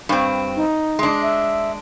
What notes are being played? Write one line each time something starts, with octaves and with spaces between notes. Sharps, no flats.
G2 C4
D#4
G#3 D4
E5